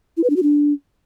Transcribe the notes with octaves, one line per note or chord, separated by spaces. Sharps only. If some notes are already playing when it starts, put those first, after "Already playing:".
E4
B4
D4
F#4
D4